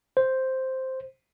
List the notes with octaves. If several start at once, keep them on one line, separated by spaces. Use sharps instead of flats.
C5